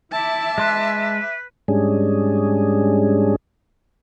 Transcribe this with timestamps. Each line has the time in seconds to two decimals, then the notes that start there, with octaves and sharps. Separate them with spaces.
0.12 E4 E5 A5 D6
0.58 G#3 B4 C6 F#6
1.68 G#2 G3 G#3 C#4 D4 G#4